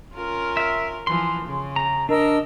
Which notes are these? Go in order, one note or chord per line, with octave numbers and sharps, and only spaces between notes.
C#4 F4 A#4
E5
E3 F3 C6
C#3
A#5
D4 A#4 D#5 E6